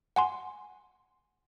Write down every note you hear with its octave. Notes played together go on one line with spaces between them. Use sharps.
F#5 G#5 C6